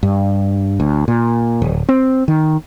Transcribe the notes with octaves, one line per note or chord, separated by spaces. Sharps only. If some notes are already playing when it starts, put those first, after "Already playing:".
G2
D2
A#2
D1
C4
D#3